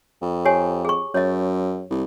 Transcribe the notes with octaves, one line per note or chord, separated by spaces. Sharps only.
F2
G4 C#5 G#5
G#4 C#6
F#2 C#5 D#5
C2